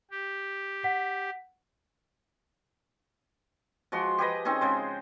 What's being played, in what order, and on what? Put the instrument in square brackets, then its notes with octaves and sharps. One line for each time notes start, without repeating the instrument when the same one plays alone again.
[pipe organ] G4
[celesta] F#5 B6
[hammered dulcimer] F3 G#3 F#4 C6
G4 G#4 B4 D#5
C4 C#4 D#4 G#4
C#3 G#3 C5